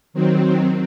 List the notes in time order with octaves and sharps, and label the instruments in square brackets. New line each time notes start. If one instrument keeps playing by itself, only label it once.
[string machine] D#3 F#3 C4